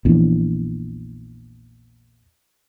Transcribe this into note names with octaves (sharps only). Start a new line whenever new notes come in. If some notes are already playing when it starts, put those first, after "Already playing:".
A#1 E2